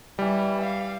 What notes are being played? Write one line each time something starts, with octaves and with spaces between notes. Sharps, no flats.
E3 G3
F5